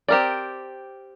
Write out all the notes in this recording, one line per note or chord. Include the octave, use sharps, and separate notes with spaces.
C4 G4 A#4 D5